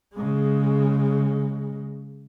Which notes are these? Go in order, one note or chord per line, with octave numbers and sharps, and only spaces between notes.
C#3 G#3